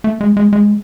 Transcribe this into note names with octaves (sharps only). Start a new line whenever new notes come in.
A3
G#3
G#3
G#3